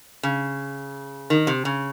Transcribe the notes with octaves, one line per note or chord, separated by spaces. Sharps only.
C#3
D#3
C3
C#3